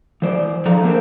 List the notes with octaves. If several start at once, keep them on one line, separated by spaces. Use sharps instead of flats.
E3 C5 D5
D3 F3 F4 A4 A#5
A3 A#3 C4 A#4 C5